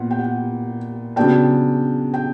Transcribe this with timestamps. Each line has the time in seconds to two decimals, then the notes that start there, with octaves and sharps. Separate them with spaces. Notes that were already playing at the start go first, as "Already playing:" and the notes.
Already playing: A#2 B3 F#5
0.11 G5
0.19 F#5
1.16 C#3 F#3 B3 D4 G5
2.14 G5